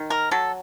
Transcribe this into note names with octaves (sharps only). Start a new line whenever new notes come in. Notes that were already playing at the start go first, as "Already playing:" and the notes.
Already playing: D#3
A#4
F#3 A4